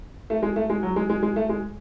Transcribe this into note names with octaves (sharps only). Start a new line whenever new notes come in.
A3
G#3
A3
G#3
F#3
G#3
G#3
G#3
A3
G#3